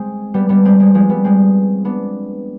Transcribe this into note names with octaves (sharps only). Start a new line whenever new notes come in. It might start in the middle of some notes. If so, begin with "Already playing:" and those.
Already playing: G#3 C4
G3 B3
G3 B3
G#3 C4
G#3 C4
F3 G#3
G3 B3
G#3 C4
B3 D4